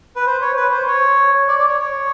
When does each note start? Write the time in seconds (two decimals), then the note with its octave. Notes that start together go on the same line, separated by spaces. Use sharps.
0.16 B4
0.26 C5
0.41 C#5
0.57 B4
0.72 C5
0.87 C#5
1.49 D5
1.59 D5
1.69 C#5
1.80 C#5